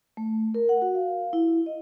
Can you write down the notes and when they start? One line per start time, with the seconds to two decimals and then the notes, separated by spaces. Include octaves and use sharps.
0.17 A3
0.55 A#4
0.69 F#5
0.82 F#4
0.95 F5
1.33 E4
1.66 D#5